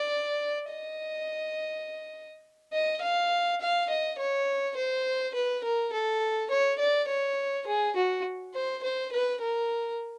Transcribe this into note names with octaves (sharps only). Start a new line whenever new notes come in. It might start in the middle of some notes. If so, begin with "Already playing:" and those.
Already playing: D5
D#5
D#5
F5
F5
D#5
C#5
C5
B4
A#4
A4
C#5
D5
C#5
G#4
F#4
C5
C5
B4
A#4